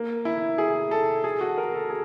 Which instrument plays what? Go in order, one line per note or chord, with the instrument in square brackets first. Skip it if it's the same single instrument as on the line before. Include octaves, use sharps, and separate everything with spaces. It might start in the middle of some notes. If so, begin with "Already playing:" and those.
Already playing: [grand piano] A#3
E4
G#4
A4
G#4
F#4
A#4
A4
G#4